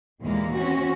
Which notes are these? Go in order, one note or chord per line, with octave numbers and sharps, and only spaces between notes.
D#2 A#2 E3 G#3 A#3
E3 C4 C#4 F#4